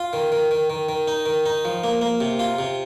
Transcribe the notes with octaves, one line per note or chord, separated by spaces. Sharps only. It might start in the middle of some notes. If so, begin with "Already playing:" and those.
Already playing: F4
D#3
D#3
D#3
D#3
D#3
D#4
D#3
D#4
F3
A#3
A#3
C3
F4
C3